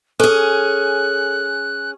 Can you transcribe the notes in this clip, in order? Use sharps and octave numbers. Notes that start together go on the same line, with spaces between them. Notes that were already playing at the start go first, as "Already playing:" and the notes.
C#4 G#4 A4 F#6